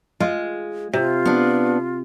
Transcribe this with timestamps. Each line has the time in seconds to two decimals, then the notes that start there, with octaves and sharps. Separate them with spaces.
0.20 G#3 F4
0.93 C3 F4
1.25 B3 D4